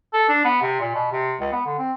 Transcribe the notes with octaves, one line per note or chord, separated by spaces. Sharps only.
A4
D4
B3
C3
A#2
B2
C3
C#2
B3
D3
C4